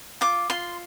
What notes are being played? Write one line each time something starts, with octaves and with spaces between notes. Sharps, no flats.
F4 D6
F4 C6